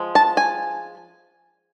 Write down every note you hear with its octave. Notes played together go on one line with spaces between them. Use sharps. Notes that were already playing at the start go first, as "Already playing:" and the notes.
Already playing: F3 G#3
A5
G#5